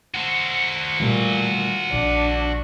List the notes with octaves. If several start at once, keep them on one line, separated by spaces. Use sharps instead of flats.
F#4 C5
A#2 E3 G3 A3
A#1 D4